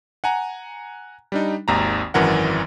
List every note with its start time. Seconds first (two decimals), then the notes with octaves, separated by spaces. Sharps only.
0.24 F#5 G#5 A#5
1.32 G3 D4 D#4
1.68 G#1 D#2 A#5
2.14 G#1 F#2 E3 A#4 F#5